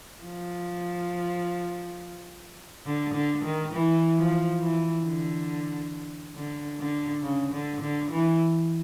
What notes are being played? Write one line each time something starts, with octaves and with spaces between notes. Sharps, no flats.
F3
D3
D3
D#3
E3
F3
E3
D3
D3
D3
C#3
D3
D3
E3